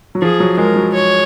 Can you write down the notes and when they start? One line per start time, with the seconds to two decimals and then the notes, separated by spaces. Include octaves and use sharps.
0.15 F#3
0.22 F3 G#4
0.40 F#3
0.57 G#3 A#4
0.76 F#3
0.94 C#5